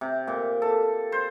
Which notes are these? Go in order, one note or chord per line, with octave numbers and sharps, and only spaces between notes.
C3
A#2
A4
C5